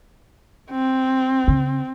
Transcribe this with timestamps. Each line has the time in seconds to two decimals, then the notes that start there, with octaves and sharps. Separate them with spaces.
0.71 C4
1.48 C#3